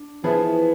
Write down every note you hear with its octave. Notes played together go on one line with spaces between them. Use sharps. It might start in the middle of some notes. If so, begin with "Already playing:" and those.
Already playing: D4
E3 F3 B3 E4 G#4 B4